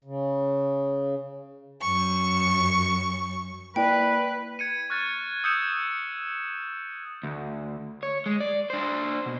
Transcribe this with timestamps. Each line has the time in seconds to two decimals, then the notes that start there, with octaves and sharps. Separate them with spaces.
0.04 C#3
1.81 F#2 C#6
3.76 A#3 E4 B4 D5 G5
4.59 G#6 C#7 D#7
4.90 C#6 F6 F#6 G#6 A6
5.44 D#6 E6 G6 C#7 E7
7.23 D2
8.03 C#5
8.26 G#3
8.40 D5
8.70 D4 C5
9.26 B2